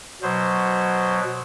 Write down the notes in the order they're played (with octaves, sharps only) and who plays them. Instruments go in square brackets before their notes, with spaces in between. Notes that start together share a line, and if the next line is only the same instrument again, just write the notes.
[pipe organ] B2 F#3 C5